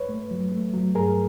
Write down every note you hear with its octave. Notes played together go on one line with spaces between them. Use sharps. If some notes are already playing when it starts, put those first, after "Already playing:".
Already playing: B4 C#5
A3
F#3
A3
F#3
G2 G#4 A#4